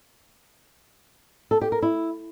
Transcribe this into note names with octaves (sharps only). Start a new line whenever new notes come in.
A4
G4
A#4
E4